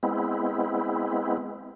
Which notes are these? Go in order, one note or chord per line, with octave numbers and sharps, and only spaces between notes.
G#3 B3 C4 E4